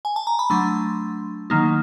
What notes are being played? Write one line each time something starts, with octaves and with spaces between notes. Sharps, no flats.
G#5
A5
A#5
B5
F#3 A3 D4 C6
D#3 F#3 A#3 D#4